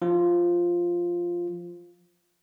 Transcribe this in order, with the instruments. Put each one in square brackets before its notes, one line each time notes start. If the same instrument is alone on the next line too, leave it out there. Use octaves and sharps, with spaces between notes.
[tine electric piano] F3 F4